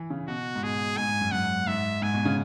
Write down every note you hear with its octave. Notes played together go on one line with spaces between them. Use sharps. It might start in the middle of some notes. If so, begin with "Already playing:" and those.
Already playing: E3
C#3
B2 F#4
G#2
B2 G#4
G#2 G#5
G#2
F#2
F#2 F#5
G#2 E5
G#2 G#5
B2
C#3